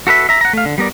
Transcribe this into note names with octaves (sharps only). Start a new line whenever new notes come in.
F#4 A4 B4 E5
E5 A#5
F#5 A#5
A3 F5
D3
G3 B3 A#4 D5